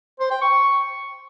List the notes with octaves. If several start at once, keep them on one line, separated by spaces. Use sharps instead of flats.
C5
G5
C#6